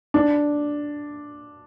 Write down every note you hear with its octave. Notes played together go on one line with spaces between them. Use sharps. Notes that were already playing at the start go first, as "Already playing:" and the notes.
D4